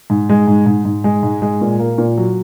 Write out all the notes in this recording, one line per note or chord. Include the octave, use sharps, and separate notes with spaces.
G#2
G#3
G#2
G#2
G#2
G#3
G#2
G#3
A#2
A#3
A#2
F#3